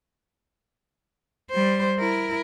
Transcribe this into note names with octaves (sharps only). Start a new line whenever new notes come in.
G3 C5
E4 A#4